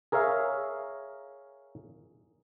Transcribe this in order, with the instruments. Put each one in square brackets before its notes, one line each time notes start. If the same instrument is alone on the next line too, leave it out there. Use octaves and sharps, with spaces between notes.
[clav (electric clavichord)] G#4 A#4 C#5 E5 F5